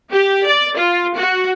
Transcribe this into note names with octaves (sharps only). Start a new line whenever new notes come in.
G4
D5
F4
F#4